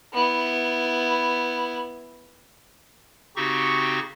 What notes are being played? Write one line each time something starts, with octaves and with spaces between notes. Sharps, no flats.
B3 E4
C#3 C4 D#4 F#4 G4 C#6